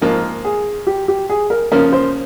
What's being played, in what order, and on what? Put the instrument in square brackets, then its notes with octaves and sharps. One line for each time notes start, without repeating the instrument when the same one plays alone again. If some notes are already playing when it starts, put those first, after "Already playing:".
[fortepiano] G#2 F3 A#3 [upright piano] A#4
[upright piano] G#4
G4
G4
G#4
A#4
[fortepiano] C#3 F3 A#3 C#4 [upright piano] A#4
[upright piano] C5